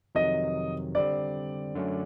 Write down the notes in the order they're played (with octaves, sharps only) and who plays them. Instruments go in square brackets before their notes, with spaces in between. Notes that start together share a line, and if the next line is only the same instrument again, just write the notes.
[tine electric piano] F2 C3 D#3 F#3 [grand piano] D#5
[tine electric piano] D3 G3 C4 [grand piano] D5
[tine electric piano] F#2 D3 F#3 A3 C#4